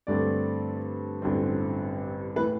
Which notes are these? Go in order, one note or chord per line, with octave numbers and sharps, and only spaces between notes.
G2 D3 A3 C4 D5
A1 G2 D3 F#3 C4
A2 E3 B4